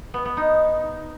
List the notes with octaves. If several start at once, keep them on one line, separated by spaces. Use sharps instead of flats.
B3
B3
D#4